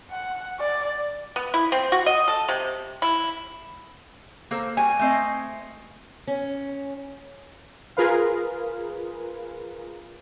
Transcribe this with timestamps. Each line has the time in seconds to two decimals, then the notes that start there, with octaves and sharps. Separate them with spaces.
0.11 F#5
0.60 D5
1.36 B3
1.54 E4
1.72 C4
1.92 F#4
2.06 D#5
2.28 A4
2.49 C3
3.02 E4
4.51 A#3 A4 C5
4.77 G3 F#4 G#5
4.99 A3 C4 D#5
6.27 C#4
7.97 F4 G#4 A#4 B4 F5